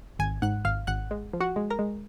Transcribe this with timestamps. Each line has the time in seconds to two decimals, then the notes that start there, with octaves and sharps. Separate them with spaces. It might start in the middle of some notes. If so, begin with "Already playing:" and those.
0.19 G#1 G#5 G#6
0.42 G#2 F#5 F#6
0.65 G#1 F5 F6
0.87 G#1 F#5 F#6
1.11 G#3
1.33 F3
1.40 F#4 F#5
1.56 G#3
1.70 A#4 A#5
1.79 G#3